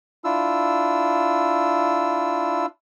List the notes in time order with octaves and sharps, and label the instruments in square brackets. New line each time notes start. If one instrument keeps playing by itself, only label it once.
[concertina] D4 E4 F4 E6